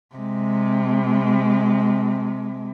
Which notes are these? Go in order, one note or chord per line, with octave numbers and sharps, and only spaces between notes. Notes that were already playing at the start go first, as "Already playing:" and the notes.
C3 G#3